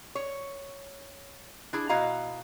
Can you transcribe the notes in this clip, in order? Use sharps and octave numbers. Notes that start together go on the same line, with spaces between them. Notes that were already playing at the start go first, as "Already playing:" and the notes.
C#5
D4 E4 G#4
B2 E4 F#4 D#5 F5 A#5